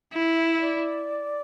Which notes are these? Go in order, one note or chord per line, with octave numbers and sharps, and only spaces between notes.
E4
E5
D5